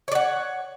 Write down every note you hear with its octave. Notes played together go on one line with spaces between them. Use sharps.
C#5 D5 F#5